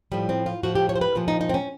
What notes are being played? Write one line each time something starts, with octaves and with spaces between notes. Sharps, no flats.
A2 F3 G3
C4
F4
A2 F3 F#4
G4
C#5
C5
B4
A#2 F3 F4
D#4
D#4
C4
C#4